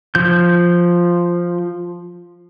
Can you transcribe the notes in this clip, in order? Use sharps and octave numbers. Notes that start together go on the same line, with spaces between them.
F3 G6